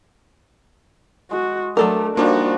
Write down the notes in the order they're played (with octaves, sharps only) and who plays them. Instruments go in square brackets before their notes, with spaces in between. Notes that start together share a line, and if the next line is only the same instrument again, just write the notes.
[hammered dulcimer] G#3 [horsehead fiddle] F#4
[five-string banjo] F#3 A4 A#4 [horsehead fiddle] A3 [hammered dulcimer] D4 D5
[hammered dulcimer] F3 G3 [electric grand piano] A#3 D4 D#4 [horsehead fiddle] F#4